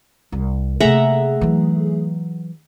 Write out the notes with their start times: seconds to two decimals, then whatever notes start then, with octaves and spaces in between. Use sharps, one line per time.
0.32 C2
0.80 C3 A3 A#3 G#4 E5 F#5 A#5
1.41 E3 F#3